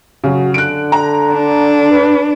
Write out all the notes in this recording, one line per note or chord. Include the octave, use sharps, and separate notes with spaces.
C#3 F#3 F#4
D3 F#6 D7
A#5
D4
B4